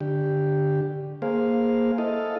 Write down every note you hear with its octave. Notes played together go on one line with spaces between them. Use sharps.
D3 G4
A#3 G#4 C5 F5
E4 A4 D#5 F5